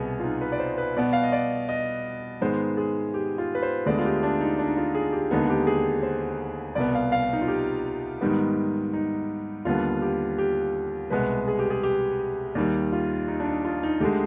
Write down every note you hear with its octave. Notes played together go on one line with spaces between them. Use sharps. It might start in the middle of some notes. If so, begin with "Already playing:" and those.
Already playing: C2 B2 B3 G#4
F4
D#4
B4
D5
C5
B4
B2 B3 D5
F5
D#5
D5
D#5
G#2 D#3 G#3 B3 C5
G#4
G4
F4
B4
C5
D2 D3 G#3 B3 D5
F4
G4
D4
D#4
D4
D#4
F4
G#4
G4
D#2 D3 G#3 B3 D#4
G4
G#4
C5
C2 B2 B3 D5
F5
F5
D#4
F4
G4
G#2 D#3 G3 B3
D#4
D#2 D3 G3 B3 F4
G4
G4
C2 B2 G#3 B3 B4
G#4
G4
G#4
G4
D#2 D#3 G3 G4
F4
D#4
D4
D#4
F4
D#4
D2 D3 G#3 G4